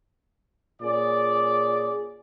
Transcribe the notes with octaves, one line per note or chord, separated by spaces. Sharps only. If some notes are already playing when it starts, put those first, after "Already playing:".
A#2 C#4 G#4 D5